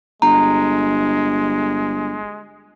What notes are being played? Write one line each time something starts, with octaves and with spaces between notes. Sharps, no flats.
G1 G#3 A#5